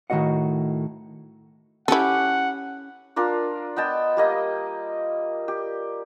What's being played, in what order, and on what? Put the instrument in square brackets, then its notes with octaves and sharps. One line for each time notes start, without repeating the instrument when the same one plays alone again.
[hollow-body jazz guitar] A2 D#3 F3 F#4 D#5 F#5
[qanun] C#4 G4 [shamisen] E4 A4 [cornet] F#5
[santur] D4 F4 A#4 D5
B3 D#5 G5 A5
G3 A#3 D#5
G4